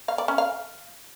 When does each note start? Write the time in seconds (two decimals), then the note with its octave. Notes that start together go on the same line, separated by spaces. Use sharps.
0.08 F5
0.18 D5
0.28 C#4
0.38 F5